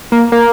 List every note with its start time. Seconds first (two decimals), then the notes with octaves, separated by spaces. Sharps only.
0.12 A#3
0.32 A#3